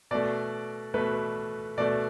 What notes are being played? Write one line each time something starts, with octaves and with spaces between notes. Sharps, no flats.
B2 A3 D5
B2 A3 B4
B2 A3 D5